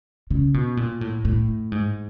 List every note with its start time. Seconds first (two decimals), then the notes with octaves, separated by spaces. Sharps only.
0.30 C#3
0.54 B2
0.77 A#2
1.01 A2
1.25 A2
1.72 G#2